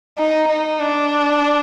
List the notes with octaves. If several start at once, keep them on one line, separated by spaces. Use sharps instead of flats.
D#4
D#4
D4